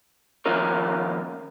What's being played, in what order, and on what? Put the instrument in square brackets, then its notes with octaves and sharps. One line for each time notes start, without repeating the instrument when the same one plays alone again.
[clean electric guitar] D#2 F3 C#4 F4 A#4 C#5